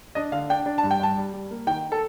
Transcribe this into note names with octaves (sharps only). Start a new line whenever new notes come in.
D4 D#5
D3 F5
D4 G5
D4
G2 A5
G5
G2 A5
G3
G3
A#3
D#3 G5
A4